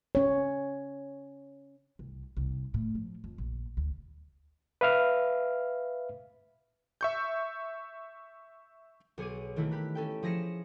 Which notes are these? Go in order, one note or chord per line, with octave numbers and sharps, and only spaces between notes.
C#4 C#5
C2
C2
A2
F3
F2
A#1
D2
B4 E5 F5 F6
E5 C#6 G6
B1 G#4 C#5 D6 D#7
D#3 E3 A3 A#3 E4
G4 B5 F#6
C#4 A4 G5
F3 E4 G#4 A#6 C#7 E7